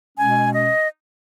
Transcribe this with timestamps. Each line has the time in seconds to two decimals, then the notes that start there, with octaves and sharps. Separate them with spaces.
0.16 B2 G#3 C#4 G#5
0.54 D#5